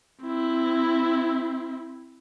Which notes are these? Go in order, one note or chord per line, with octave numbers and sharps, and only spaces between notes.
C4 E4